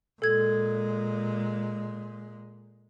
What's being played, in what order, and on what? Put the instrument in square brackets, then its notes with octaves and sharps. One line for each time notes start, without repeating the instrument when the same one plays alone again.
[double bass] A#2 G#3 [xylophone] A4 G#6